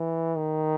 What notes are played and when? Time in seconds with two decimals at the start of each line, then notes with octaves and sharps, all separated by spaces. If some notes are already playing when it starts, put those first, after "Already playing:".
Already playing: E3
0.37 D#3